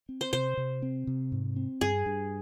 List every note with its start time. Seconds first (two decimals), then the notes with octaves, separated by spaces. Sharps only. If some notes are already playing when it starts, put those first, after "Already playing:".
0.09 C4
0.21 C5
0.33 C3 C5
0.57 C3
0.82 C4
1.07 C3
1.32 G#2
1.56 C4
1.81 G2 G#4
2.06 G2